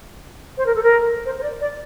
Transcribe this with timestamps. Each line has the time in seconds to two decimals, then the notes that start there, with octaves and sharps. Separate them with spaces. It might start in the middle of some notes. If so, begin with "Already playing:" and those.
0.57 C5
0.66 A#4
0.75 A4
0.83 A#4
1.25 C5
1.38 C5
1.43 D5
1.60 D5